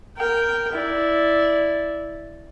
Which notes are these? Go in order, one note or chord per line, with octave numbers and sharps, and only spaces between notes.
A#4 G5
E4 D5